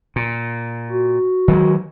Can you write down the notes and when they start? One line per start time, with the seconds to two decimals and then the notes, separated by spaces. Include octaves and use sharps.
0.16 A#2
0.91 F#4
1.48 D#3 F#3 G#3